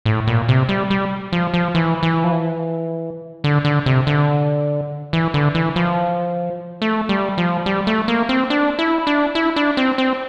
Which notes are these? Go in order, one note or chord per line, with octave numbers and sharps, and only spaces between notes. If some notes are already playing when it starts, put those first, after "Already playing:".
A2
A#2
C3
G3
G3
F3
F3
E3
E3
F3
E3
D3
D3
C3
D3
E3
D3
E3
F3
A3
G3
F3
G3
A3
A#3
C4
D4
E4
D4
E4
D4
C4
C4